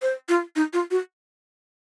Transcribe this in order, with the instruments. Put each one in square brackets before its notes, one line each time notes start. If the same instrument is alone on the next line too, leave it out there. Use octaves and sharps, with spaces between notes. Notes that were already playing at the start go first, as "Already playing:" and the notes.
[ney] C5
F4
D#4
F4
F#4